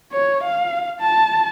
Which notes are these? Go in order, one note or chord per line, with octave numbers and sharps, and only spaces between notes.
C#5
F5
A5